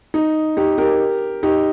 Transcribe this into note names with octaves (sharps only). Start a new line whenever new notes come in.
D#4
D#4 G4
G4 A#4
D#4 G4